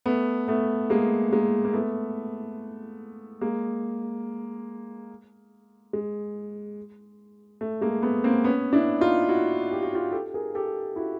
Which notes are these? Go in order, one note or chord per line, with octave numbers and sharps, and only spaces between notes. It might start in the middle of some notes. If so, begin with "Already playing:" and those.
A3 B3
A3 B3
G#3 A#3
G#3 A#3
A#3
A3 B3
G#3 A#3
G#3
A3
G#3 A#3
A3 B3
A#3 C4
B3 C#4
D4 E4
D#4 F4
E4 F#4
G4
F#4
F4 G4
G4 A4
G#4 A#4
G4 A4
E4 F#4